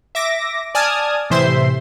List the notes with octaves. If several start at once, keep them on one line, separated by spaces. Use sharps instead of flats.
E5 D6 A#6
D5 G#5 A5 D#6 F6 G#6
A2 C3 E3 C5 E5 C6